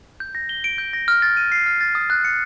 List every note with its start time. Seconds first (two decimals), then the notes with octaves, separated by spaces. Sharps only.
0.20 G6
0.35 A#6
0.49 G7
0.64 D7
0.78 G6
0.93 A#6
1.08 F6
1.22 A6
1.37 D#7
1.52 C7
1.66 F6
1.81 A6
1.95 D#6
2.10 F#6
2.25 C#7